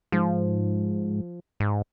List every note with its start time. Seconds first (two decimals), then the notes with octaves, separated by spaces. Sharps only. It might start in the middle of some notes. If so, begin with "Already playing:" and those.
0.12 G#2 F3
1.60 G#2